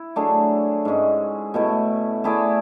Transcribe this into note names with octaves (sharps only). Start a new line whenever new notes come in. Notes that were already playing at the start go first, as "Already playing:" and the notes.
Already playing: E4
F#3 A3 D4 G#4
G#2 G#3 C#4
B2 A3 E4
A3 E4 G#4 D5